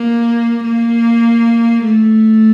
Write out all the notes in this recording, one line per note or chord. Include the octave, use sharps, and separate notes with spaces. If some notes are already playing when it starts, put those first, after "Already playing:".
Already playing: A#3
A#3
A3